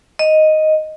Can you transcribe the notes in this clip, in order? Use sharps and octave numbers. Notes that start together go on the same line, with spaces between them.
D#5